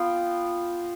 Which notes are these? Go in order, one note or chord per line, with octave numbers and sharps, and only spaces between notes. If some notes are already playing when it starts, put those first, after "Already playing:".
Already playing: B3 F4 G5